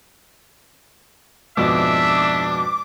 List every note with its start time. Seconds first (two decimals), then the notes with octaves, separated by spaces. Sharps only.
1.57 F2 G#2 B2 D4 E5 D6